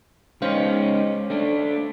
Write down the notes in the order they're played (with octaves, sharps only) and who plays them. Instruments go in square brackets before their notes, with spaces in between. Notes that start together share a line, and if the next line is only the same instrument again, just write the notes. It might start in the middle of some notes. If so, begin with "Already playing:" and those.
[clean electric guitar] G#3 C#4 D#4 [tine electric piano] C5 C#5 F5
[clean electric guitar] A3 D4